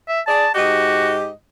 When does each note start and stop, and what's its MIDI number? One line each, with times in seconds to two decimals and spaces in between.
0.08 0.21 76
0.27 0.45 68
0.27 0.45 74
0.27 0.51 81
0.55 1.29 44
0.55 1.15 66
0.55 1.29 67
0.55 1.29 75